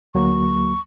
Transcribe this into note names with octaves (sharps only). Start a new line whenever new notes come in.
D2 F#3 A#3 C#6